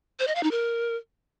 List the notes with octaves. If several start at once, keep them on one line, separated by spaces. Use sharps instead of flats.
C5
D#5
F5
D#4
A#4